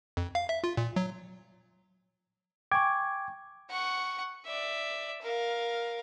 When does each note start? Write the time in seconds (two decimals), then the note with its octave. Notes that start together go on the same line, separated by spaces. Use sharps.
0.17 F2
0.35 F5
0.49 E5
0.64 F4
0.77 A#2
0.96 F#3
2.72 G5 G#5 C#6 D6 G#6
3.70 F#5 C#6
4.45 D5 E5
5.21 A#4 F5